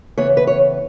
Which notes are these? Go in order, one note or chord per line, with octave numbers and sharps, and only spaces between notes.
C#3 E3 B3 C#5
B4
C#5